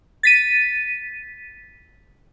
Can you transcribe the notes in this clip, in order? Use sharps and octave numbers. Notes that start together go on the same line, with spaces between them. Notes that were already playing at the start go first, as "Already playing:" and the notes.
A6 B6 D#7